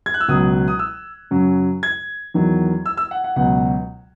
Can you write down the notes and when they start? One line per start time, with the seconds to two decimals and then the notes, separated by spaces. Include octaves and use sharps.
0.06 G#6
0.14 F#6
0.20 E6
0.28 C#2 B2 F#3 D#6
0.68 D#6
0.79 E6
1.31 F#2 C#3 F#3
1.83 G#6
2.34 E2 D#3 F#3
2.86 E6
2.97 E6
3.11 F#5
3.24 F#5
3.36 C#2 B2 F#3 F#5